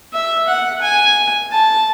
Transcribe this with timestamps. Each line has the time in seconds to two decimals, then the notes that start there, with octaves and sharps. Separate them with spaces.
0.13 E5
0.48 F#5
0.82 G#5
1.52 A5